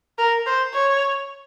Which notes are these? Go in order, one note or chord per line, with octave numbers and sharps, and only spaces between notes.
A#4
C5
C#5